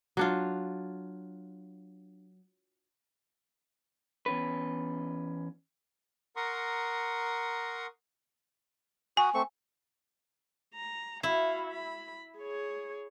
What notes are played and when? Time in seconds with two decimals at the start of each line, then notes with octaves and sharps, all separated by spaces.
0.17 F#3 D4 F4
4.26 E2 C#4 B4
6.36 A#4 F#5 A#5 C6 C#6 D#6
9.17 F#4 G#5 D#6
9.34 A3 C4 C#6
10.75 A#5
11.23 E4 F#4 F5
11.71 B5
12.38 G#4 C#5